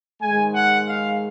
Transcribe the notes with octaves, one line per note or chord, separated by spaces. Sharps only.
G#2 D#3 G#3 G#5
F#5
F5